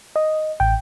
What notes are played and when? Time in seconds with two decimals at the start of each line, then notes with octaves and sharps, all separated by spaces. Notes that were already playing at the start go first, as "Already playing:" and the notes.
0.16 D#5
0.60 A1 G5